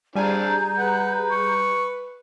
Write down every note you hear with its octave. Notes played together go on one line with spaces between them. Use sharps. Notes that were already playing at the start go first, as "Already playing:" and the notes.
G3 C4 D4 F4 G#4 G#5 A#5 G6
B4 F#5
C#6